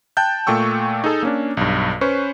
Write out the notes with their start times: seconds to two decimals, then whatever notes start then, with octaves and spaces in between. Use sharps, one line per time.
0.17 G5 A5 F#6 G6
0.47 A#2 A3 G5 C#6 E6
1.04 D#4 G#4 A4
1.23 A#3 C#4 D4
1.57 B1 G2
2.01 C#4 B4 C5 C#6